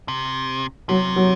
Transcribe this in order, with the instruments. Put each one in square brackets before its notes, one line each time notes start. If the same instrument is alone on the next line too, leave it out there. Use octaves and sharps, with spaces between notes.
[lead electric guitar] C3
[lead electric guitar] C3 [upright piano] F#3
[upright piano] F#3